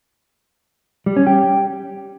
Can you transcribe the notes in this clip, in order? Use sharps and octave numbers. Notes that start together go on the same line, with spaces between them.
G3
C#4
G4